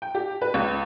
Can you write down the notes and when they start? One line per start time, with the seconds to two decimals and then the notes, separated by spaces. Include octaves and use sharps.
0.02 G5
0.15 G4
0.41 B4
0.54 C#2